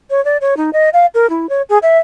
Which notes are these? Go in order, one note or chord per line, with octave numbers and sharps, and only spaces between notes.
C#5
D5
C#5
D#4
D#5
F5
A#4
E4
C#5
G#4
E5